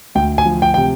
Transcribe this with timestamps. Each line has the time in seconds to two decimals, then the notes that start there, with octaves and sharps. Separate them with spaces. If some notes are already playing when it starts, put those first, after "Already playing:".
0.15 D2 G5
0.38 G#5
0.46 F3
0.62 G5
0.74 C3 G5